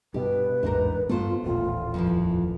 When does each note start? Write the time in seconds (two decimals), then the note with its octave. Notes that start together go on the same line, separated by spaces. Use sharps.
0.14 G2 B2 G4 B4
0.63 A1 E2 G#2 D4 D#4 A#4
1.09 G2 A3 B3 F4 C5
1.43 D#1 A1 A#2 F4
1.94 F2 E3 F3